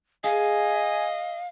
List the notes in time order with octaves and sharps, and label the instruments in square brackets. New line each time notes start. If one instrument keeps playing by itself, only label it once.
[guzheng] G#4 [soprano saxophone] D#5 [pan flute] F5 [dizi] G#5